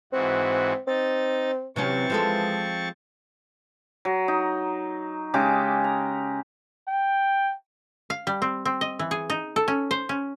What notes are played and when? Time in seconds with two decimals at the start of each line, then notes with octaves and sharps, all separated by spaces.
0.13 G#2 E3 C4 F#4
0.87 C4 D#4 A6
1.76 C3 E3 F#3 C4 C#4 C#6 A6
2.10 F3 G#3 A4
4.05 F#3
4.28 D#4
5.34 C#3 G#3 G4 D6
5.84 A#5
6.88 G5
8.10 F5
8.27 G3
8.42 C4
8.65 C4
8.81 D#5
8.99 E3
9.11 G#4
9.30 D#4
9.56 A4
9.68 C#4
9.91 C5
10.09 C#4